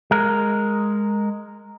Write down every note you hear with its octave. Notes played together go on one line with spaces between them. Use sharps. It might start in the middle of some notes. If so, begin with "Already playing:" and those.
G#3 A#4